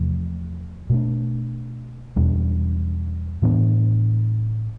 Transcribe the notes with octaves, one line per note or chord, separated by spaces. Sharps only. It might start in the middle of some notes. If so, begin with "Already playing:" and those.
Already playing: E2 C3 F3 A3
B2 A3 D4
E2 B2 G3 D4
A2 E3 B3 D4